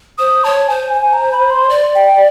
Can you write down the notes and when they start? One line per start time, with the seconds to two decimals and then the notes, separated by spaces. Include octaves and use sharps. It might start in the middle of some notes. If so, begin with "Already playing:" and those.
0.18 C5 D#6
0.44 C#5 A5
0.68 C5 G#5
0.94 G#5
1.13 A#5
1.32 B5
1.50 C6
1.69 D5
1.95 G5